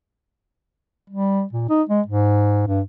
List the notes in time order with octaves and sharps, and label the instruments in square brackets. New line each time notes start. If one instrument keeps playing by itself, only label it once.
[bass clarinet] G3
A#2
D#4
G#3
G#2
G2